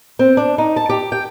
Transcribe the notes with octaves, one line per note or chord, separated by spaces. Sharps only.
C4
D4
D#4
A5
G4
G5